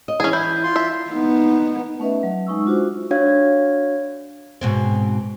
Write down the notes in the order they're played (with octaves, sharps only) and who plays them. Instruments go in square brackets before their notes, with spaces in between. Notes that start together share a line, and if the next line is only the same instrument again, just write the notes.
[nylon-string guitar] D#5
[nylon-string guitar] E3 [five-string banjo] C#4 G#4
[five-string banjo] E4 [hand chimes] G6
[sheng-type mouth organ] F4 C6
[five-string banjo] E5
[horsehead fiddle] B3 D#4
[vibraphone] A3 C#4 B4 D#5 E5
F#3
G#3 D#4 C#6 E6
D4 F4 F#4 C5
[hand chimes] D4 F#4 C#5 F5 G#6
[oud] G#2 B2 C4